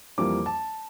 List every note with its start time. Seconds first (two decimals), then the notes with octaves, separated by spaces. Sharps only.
0.18 F2 E3 G3 A#3 D6
0.46 A5